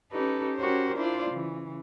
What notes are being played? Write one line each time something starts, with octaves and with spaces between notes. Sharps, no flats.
C#4 D#4 G4 A4 B4
C#4 F#4 G4 A#4 C5 C#5
D4 E4 F4 C5 D5
C#3 E3